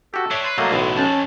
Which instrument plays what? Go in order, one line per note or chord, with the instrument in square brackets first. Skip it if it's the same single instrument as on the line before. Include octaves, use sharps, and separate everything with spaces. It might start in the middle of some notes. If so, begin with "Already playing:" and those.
[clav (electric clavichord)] F#4 G4 [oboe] A4
[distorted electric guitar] D4 G4 [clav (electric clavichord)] C#5 E5
[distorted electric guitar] B4 [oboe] C6
[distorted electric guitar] C2 D#5 [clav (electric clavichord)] F#3 A3 A#3
[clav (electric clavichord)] B1 A2 [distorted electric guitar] E3 F#3
[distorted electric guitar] F2 [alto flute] C#4 [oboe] A5